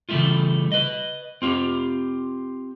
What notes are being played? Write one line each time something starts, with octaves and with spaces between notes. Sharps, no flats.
C#3 E3 G3 A3 E4 F4
B4 D#5
C4 F4 G4